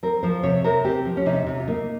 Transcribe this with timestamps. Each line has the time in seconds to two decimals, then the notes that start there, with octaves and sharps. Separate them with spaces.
0.03 C4 A#4
0.23 F3 C5
0.43 C3 C#5
0.64 C3 A#4
0.84 C4 G4
1.05 F3
1.17 C#4
1.26 C3 D#4
1.47 C3
1.60 F4
1.68 A#3 D#4